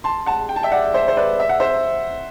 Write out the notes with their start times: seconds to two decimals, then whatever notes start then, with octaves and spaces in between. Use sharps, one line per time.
0.04 A5 C6
0.26 F#5 A5
0.49 G5
0.56 A5
0.63 E5 G5
0.72 D5 F#5
0.94 C5 E5
1.08 C5
1.17 B4 D5
1.40 E5
1.49 F#5
1.60 C5 E5